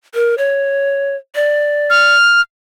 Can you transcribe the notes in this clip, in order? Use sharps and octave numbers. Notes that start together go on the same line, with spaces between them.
A#4
C#5
D5
F6